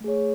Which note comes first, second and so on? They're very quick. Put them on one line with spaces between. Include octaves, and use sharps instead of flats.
A3 G#4 C#5